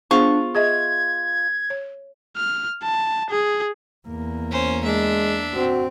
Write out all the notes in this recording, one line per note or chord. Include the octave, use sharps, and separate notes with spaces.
B3 D4 F4 G#4 C5 C#6
G#4 D#5 E5 G#6
C#5
F6
A5
G#4
E2 A#3
C#4 C5
G#3 D4 E5
C4 F#4